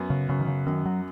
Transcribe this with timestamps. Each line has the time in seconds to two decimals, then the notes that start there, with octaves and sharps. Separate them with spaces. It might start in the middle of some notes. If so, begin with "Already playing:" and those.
Already playing: F#2 B3
0.10 C#3
0.29 F#2 C#3
0.40 D#3
0.47 C#3
0.66 F#2 D#3
0.86 F#3